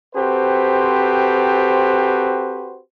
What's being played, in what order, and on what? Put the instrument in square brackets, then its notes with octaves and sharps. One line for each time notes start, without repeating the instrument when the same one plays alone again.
[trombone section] C4 F#4 G4 A4 B4 C5